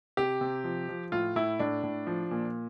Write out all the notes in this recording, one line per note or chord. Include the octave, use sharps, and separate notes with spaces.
C3 G4
C3
F3
F3
A2 F4
A2 E4
A2 D4
A2
F3
A#2